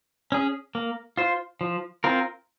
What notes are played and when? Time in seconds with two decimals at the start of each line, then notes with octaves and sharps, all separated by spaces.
0.32 C#4 G#4
0.75 A#3
1.17 F4 C5
1.61 F3
2.04 C4 F4 A#4